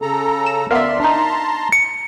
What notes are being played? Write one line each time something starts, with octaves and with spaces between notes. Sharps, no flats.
C#3 A4 A#5
E7
D2 B3 A#4 D5 E5 F5 C6
D4 D#4 A5 A#5 C6
C#7